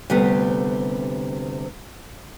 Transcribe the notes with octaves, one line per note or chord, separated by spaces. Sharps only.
D2 C3 G3 B3